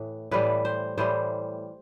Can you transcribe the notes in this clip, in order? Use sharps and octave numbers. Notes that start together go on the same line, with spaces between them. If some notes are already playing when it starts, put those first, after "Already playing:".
Already playing: A2 E3
A2 E3 G3 B4
C5
A2 E3 G3 C5